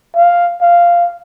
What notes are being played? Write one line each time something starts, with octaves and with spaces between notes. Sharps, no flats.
F5
F5